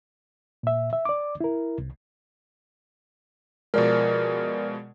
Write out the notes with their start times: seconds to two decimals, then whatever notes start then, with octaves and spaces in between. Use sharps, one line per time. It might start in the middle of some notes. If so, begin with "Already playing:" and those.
0.63 A#2 E5
0.93 E5
1.05 D5 D6
1.41 E4 A#4
1.78 C2
3.74 B2 F3 G#3 A#4 D5